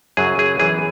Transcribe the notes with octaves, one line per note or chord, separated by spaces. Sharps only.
F#2 C#3 F#3 G#4
G#4
F#2 E3 B3 G#4